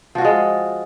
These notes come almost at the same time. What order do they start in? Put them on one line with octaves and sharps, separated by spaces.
F3 F#4 F4 G#3